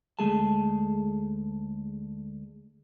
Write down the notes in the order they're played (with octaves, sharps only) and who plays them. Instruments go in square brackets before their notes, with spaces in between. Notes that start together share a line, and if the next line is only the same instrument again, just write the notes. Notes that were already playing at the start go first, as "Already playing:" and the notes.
[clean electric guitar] D2 G#3 A3 G#4 A4 A5